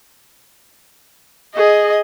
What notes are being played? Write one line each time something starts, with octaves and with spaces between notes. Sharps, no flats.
G#4 D#5